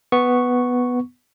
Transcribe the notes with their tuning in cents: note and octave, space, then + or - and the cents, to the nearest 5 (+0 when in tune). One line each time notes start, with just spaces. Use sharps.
B3 +0 C#6 +0